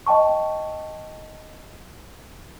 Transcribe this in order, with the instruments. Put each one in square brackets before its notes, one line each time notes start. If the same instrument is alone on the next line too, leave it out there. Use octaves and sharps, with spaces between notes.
[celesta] D#5 G5 A5 C#6